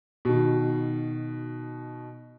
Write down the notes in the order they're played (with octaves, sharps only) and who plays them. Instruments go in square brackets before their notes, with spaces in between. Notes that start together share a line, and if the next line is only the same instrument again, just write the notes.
[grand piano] B2 D#3